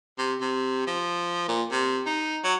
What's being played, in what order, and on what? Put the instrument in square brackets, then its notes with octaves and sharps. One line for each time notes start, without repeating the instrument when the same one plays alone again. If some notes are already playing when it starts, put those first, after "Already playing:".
[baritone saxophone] C3
C3
F3
A#2
C3
D#4
F#3